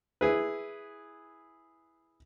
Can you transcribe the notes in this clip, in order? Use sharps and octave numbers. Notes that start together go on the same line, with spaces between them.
E4 G#4 B4